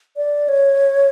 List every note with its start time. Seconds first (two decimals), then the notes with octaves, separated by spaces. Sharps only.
0.17 D5
0.48 C#5